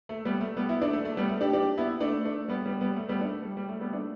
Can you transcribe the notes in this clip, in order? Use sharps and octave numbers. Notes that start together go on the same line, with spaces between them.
A3
G3 B3
A3
G3 B3
B3 E4
A3 D4
A3
A3
G3 B3
A3
D4 G4
D4 G4
B3 E4
A3 D4
A3 D4
G3 B3
G3 B3
G3 B3
A3
G3 B3
A3 D4
G3
G3
A3
G3 B3
A3 D4